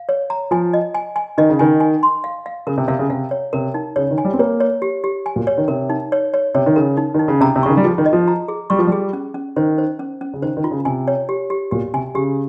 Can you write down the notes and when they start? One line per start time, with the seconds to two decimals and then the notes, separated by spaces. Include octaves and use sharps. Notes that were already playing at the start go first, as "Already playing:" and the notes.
Already playing: F5
0.09 C#5
0.30 A#5
0.51 F3 G#5
0.73 D#5
0.95 G#5
1.16 G#5
1.38 D#3 D#5
1.49 C#3
1.59 D#3 G#5
1.80 G#5
2.03 C6
2.24 F5
2.46 F5
2.67 C#3 A#4
2.78 C3
2.88 C3 F5
2.99 C#3
3.10 C3 F5
3.31 C#5
3.53 C3 A#4
3.74 D#4
3.96 C#3 C#5
4.11 D#3
4.18 G#5
4.25 G3
4.33 C4
4.39 A#3 C#5
4.60 C#5
4.82 G4
5.04 G4
5.26 G#5
5.36 A#2
5.47 C#5
5.58 D#3
5.68 C3 A#4
5.90 D#4
6.12 C#5
6.34 C#5
6.55 C3 C#5
6.66 D#3
6.76 C#3 A#4
6.97 D#4
7.14 D#3 D#4
7.28 C#3
7.41 C3 A#5
7.56 C3
7.63 C#3 C#6
7.69 D#3
7.77 G3
7.83 F3 G#4
7.98 D#3
8.06 D#5
8.13 F3
8.28 A#5
8.48 G#4
8.70 G3 C#6
8.79 F3
8.87 G3 G#4
9.13 C#4
9.34 C#4
9.56 D#3 C5
9.78 C5
9.99 C#4
10.21 C#4
10.33 C#3
10.42 D#3 C5
10.57 D#3
10.64 F4
10.71 C#3
10.85 C3 G#5
11.08 C#5
11.29 G4
11.50 G4
11.71 A#2 G4
11.94 C3 G#5
12.15 C#3 G4